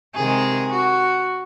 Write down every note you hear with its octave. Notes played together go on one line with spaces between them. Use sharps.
C3 D#3 G#3 G#4
F#4